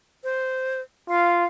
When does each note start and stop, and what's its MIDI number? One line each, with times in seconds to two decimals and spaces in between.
0.24 0.81 72
1.09 1.46 65
1.09 1.47 77